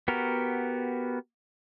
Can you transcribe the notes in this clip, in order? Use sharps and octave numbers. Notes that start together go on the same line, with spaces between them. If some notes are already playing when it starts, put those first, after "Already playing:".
B3 F#4 G4 A#4